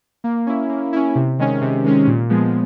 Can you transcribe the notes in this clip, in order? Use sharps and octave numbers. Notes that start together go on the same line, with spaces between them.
A#3
C#4 E4
A#3
C#4 E4
C3
D#3 G#3 C#4
C3
D#3 G#3 C#4
A#2
F3 G#3 B3